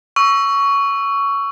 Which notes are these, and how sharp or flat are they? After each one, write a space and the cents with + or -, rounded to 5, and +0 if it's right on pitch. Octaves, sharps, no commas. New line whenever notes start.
C#6 +10 E6 +10